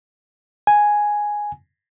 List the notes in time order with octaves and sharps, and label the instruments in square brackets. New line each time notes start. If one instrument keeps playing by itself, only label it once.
[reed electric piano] G#5